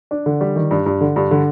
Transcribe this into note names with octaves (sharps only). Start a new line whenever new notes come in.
D4
D3
G3
D#3
G2
G2
D3
G2
D3